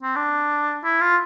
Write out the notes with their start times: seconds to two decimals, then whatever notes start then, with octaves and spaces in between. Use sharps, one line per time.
0.03 C4
0.16 D4
0.84 E4
1.01 F4